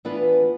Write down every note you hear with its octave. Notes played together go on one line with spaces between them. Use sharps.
E3 B3 D4 F4 B4